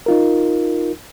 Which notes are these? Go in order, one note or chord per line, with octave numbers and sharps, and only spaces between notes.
D#4 F4 A#4